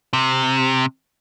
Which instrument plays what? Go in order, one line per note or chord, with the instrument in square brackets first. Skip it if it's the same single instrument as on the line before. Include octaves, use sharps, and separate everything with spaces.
[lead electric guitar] C3